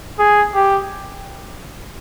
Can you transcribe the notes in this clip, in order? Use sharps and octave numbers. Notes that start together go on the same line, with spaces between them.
G#4
G4